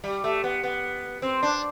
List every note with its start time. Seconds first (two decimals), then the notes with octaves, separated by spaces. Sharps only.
0.04 G3
0.24 A3
0.44 B3
0.64 B3
1.22 C4
1.43 D4